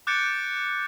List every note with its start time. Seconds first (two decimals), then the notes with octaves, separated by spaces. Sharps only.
0.07 D6 F#6 G6 A6 C#7 D7